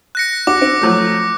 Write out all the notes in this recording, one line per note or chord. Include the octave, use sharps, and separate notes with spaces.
F#6 A#6 C#7
F#4 D6
C4
F3 F#3 A3